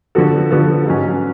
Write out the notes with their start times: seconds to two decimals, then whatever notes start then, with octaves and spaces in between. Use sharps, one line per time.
0.15 D3 F3 B3 F#4 A4
0.51 D3 F3 B3 F#4 A4
0.86 G#2 F#3 C#4